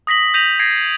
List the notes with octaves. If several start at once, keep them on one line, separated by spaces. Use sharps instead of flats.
D#6 A#6 B6 F#7
G6 A#6 B6 D#7 F7 F#7
G#6 A#6 C7 D7